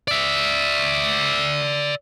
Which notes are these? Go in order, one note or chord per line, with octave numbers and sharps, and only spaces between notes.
D5 E5